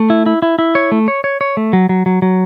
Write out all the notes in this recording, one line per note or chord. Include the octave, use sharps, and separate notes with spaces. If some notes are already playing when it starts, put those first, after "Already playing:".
Already playing: A3
E4
E4
E4
E4
C#5
A3
C#5
C#5
C#5
A3
F#3
F#3
F#3
F#3